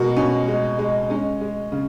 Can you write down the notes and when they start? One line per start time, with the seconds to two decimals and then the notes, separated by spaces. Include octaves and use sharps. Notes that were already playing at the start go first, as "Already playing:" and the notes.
Already playing: B2 G#3 F#4 A#4
0.16 B2 C#4
0.48 G#3
0.79 G#3
1.10 G#3 C#4
1.41 G#3
1.72 C#3